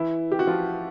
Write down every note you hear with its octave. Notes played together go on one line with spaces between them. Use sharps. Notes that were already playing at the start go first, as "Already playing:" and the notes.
Already playing: E3 E4
G4
F#4
F3 F4